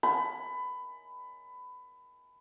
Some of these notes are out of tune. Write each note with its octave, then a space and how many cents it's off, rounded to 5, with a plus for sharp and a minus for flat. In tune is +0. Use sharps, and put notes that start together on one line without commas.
B5 +20